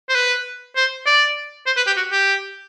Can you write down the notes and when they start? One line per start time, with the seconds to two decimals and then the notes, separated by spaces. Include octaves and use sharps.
0.09 C5
0.15 B4
0.76 C5
1.06 D5
1.66 C5
1.76 B4
1.87 G4
1.97 F#4
2.12 G4